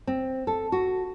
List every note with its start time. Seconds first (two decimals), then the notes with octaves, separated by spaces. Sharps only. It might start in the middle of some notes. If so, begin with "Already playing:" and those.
0.07 C4
0.47 A4
0.72 F#4